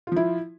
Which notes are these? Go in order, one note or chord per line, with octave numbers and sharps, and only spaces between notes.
F3 E4 F4